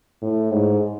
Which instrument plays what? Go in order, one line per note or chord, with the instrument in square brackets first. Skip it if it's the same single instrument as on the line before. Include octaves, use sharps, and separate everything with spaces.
[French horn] A2
G#2